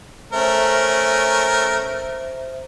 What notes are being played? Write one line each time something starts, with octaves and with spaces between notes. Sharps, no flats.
A3 C#4 A#4 C5 E5